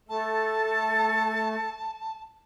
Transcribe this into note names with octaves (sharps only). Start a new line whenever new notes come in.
A3 A4 A5